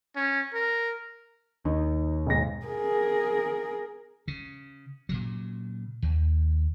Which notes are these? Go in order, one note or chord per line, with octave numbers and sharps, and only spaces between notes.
C#4
A#4
D#2 D#4
B1 G#2 A#6
G#4 A#4
C#3
A#2 C#3 F#3
D#2